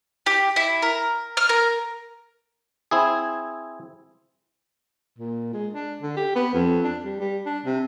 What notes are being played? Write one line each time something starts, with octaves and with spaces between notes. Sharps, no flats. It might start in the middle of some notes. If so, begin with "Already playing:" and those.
G4
E4
A#4
F6
A#4
C4 E4 G#4
A#2
G#3
D4
D3
G4
B3
F2
D4
G3
G3
D4
C3